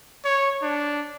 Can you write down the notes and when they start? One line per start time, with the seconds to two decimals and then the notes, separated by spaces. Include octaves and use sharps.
0.25 C#5
0.63 D4